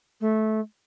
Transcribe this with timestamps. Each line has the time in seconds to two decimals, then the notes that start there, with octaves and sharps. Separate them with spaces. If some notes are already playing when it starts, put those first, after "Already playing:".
0.20 A3